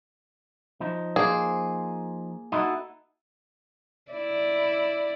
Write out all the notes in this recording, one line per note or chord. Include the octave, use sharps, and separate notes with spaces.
F3 D#4
A#3 G#4 C5
D#4 E4 F#4 A4
E4 D5